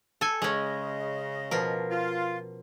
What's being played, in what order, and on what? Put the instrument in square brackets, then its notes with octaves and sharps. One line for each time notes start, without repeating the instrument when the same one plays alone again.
[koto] A4 G#5
[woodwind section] C#3 D#5 [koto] G#3 C#4
[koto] B2 F3 A#4
[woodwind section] F4